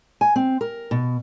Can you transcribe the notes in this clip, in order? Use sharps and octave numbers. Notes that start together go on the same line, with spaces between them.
G#5
C4
A#4
B2